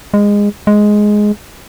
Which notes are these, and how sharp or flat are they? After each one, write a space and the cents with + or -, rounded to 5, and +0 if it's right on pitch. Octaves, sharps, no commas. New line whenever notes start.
G#3 -20
G#3 +5